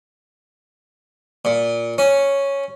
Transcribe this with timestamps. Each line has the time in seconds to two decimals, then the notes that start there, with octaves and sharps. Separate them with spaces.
1.45 A#2
1.98 C#4